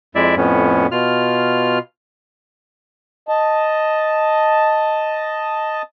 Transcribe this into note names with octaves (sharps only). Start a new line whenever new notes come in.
F2 G#3 E4 D5 E5
F2 A2 B3 C#4
B2 F4 F6
D#5 A5